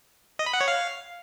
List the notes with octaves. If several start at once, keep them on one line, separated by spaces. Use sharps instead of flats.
D#5
B5
F#5
C#5
F5